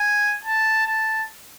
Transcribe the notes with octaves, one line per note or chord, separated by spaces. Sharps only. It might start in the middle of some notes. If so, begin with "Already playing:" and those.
Already playing: G#5
A5
A5